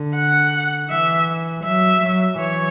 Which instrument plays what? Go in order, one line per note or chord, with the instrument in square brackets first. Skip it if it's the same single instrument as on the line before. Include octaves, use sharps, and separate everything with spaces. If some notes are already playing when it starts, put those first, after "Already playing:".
Already playing: [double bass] D3
[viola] F#5
[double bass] E3 [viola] E5
[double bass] F#3 [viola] E5
[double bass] F#3
[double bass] E3 [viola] C#5